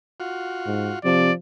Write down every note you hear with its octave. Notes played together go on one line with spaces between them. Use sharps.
F4 F#4
G#2
C3 F3 D5